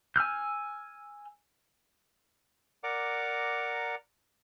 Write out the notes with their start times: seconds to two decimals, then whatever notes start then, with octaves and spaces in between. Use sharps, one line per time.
0.16 G#5 E6 F6 G6
2.84 A#4 D5 F#5 A#5 D6